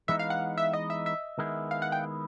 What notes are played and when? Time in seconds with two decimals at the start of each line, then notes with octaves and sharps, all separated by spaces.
0.08 E3 G#3 B3 D#4 E5
0.19 F5
0.30 F#5
0.58 E5
0.73 D#5
0.90 E5
1.06 E5
1.39 D#3 G#3 B3 E4
1.71 F5
1.82 F#5
1.92 G5